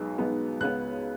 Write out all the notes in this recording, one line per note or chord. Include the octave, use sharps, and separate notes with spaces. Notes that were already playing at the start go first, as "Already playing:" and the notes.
Already playing: B1 B2 G#3 B3 D#4
B1 B2 G#3 B3 D#4
C#2 C#3 B3 F#6